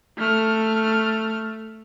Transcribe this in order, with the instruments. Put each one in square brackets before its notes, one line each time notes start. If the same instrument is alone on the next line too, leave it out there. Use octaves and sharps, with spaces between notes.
[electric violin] A3 F6